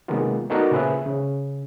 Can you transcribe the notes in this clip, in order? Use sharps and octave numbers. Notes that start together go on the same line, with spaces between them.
C3 D#3 G#3 A#3 B3 F4
B3 D#4 F#4 A4 A#4 D5
A#2 C#3 G#4 B4 C5 E5
C#3